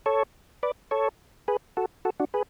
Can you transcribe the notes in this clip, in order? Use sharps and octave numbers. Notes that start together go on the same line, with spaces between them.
A4 C#5
B4 D5
A4 C#5
G#4 B4
F#4 A4
F#4 A4
D4 F#4
G#4 B4